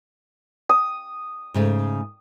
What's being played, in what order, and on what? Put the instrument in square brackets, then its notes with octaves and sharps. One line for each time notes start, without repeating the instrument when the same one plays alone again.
[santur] D#6
[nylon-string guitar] G#2 C#3 A3